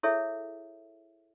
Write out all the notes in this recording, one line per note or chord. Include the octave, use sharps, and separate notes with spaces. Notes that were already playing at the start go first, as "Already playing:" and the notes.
E4 G#4 A4 C#5 E5